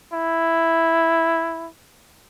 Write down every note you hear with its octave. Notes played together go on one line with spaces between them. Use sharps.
E4